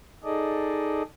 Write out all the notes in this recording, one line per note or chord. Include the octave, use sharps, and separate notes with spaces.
D#4 G#4 A4 D5 D#5